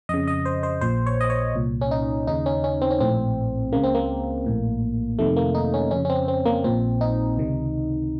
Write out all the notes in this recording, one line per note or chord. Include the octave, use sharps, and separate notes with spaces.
F2 C#3 D#5
D#5
C5
C5
A#1 A#2 C5
C#5
D#5
C#5
C2 A#2
C#4
D#4
D#2 C#3 D#4
C#4
C#4
C4
C#4
A#1 A2 C4
C#2 C#3 A#3
C4
A#3
A#1 A2
F2 C3 D#3 A3
A#3
D#4
C#4
F2 C#3 C#4
C#4
C4
C4
A#3
A#1 A#2 C4
D#4
C#2 C3 D#3